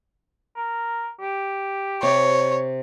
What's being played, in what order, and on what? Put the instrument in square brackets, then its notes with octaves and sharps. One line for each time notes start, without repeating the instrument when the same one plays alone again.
[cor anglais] A#4
G4
[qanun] C3 [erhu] C#5